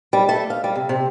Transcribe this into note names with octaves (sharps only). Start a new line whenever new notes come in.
G3
A3
F5
G3
C3
C3